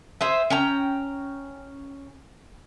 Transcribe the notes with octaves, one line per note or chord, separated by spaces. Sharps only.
G#4 C5 E5
C#4 G5 A#5